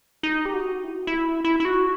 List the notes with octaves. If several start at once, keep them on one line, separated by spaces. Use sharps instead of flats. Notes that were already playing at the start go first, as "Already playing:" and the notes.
D#4
G4
F#4
E4
F#4
E4
E4
E4
F#4